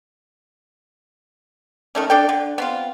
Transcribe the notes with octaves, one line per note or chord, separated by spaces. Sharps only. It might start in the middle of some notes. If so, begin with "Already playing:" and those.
D#3 A3 C#4
D4 A4 G5
D3
B3 C4 F4